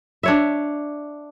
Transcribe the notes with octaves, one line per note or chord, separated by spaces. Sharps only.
D4 C#5 E5